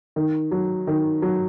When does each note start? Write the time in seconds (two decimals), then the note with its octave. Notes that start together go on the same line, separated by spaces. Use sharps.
0.16 D#3
0.51 F#3
0.87 D#3
1.22 F#3